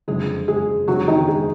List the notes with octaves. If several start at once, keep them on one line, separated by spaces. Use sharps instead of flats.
F#1 F2 D3 G#3 G#4
G#3 G#4
F#1 F2 D3 F#3 G#3 F#4
D#3 D#4
G#3 G#4